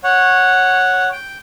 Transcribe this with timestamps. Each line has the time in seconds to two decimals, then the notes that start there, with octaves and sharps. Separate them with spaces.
0.04 C#5 F#5
1.12 G5